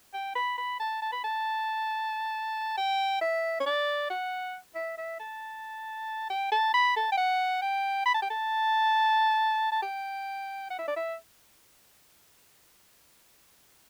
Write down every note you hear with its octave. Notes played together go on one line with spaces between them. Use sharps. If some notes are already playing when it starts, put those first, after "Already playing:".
G5
B5
B5
A5
A5
B5
A5
G5
E5
C#5
D5
F#5
E5
E5
A5
G5
A5
B5
A5
G5
F#5
G5
B5
A5
G5
A5
A5
G5
F#5
E5
D5
E5